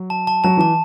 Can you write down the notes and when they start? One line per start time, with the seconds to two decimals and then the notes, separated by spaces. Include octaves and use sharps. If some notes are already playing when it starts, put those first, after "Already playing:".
Already playing: F#3
0.10 A5
0.27 A5
0.44 F#3 A5
0.57 E3 A5